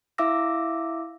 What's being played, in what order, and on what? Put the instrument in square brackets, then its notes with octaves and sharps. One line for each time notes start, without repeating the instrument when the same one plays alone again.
[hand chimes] E4 E5 F5 D6 E6 A#6